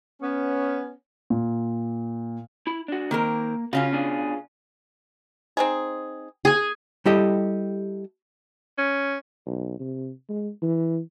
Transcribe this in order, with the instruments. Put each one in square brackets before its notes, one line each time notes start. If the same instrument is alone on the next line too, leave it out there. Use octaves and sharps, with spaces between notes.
[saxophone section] B3 C#4
[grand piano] A#2
[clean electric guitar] E4 B5
D4 F#4
[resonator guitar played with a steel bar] D#3 C4 A#4 [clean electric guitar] A#3
[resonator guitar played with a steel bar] C#3 C#4 F4 [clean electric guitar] F#4 F5
[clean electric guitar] B2 D4 G#4
[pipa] C4 D#4 G#4
[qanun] G#4 G#5
[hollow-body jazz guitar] G3 E4 G4 A4 D#5
[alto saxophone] C#4
[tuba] B1
C3
G#3
E3